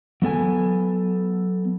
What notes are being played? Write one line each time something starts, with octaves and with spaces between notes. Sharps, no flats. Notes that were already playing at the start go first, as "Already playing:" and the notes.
F#3 B3 A4 G#5